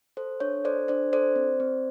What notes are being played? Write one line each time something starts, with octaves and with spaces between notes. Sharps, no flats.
A4 C5
D4 C#5
A4 C5 D5
D4 C5 D5
A4 C5 D5
C4
C4